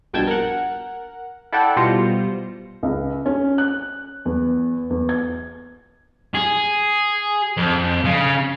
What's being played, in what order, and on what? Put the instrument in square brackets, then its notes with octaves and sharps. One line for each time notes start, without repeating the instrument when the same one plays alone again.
[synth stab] A#1 G2 B2 G5 A5 G#6
A#4 F#5
E4 A4 D5 E5 F#5 G5
B2 G3 F4 C5 A#6 C#7
[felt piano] C#2
C#4
F#6
E2
E2
G#6
[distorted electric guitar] G#4
F2
C#3